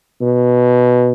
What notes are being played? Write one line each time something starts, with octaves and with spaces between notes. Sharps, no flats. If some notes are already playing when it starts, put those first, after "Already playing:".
B2